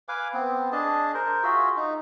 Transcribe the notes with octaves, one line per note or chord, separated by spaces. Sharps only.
B4 F5 G#5 D6
B3 C4
D4 G#4 D#5 A5
A#4 C5
F4 F#4 G#4 E5
D#4